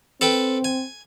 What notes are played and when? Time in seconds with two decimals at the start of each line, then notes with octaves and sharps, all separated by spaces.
0.21 C4 A4 B4 G5
0.64 G#5